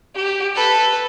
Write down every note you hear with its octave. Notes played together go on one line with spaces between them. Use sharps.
G4
A4 B4